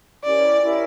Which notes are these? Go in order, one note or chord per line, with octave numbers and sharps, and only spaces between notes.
C#4 E4 G4 A#4 D5
C#4 E4 G4 A#4